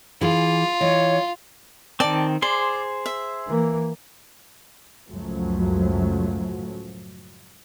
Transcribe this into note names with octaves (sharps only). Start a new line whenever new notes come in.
E3 F4 G#4
E3 C#5 D#5
D#3 C4 D5 A5
G#4 C5 D5 C6
E5
E3 A#3
C#2 F#2 A2 F3 F#3 A3